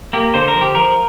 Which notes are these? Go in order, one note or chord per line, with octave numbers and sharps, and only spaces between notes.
A#3 G4
D3 C5
A#4
F3
G4
F3 A#4